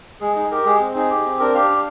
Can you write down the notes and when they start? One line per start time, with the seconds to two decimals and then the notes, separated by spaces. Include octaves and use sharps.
0.21 G#3 G#4
0.36 D#4 G#4
0.51 G4 A#4
0.65 G#3 G#4
0.80 C4
0.95 D#4 G#4
1.10 G4
1.25 C4
1.40 D4 A#4
1.54 G4 F5
1.69 D4